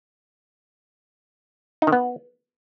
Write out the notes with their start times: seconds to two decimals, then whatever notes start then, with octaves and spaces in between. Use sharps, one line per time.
1.82 D#4
1.87 D#3
1.92 B3